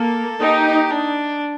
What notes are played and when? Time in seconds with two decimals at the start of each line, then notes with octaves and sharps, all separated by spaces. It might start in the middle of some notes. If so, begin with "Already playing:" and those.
Already playing: A#3 A4
0.42 D#4 G4
0.90 D4